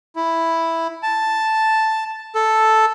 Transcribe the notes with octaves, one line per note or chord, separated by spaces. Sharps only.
E4
A5
A4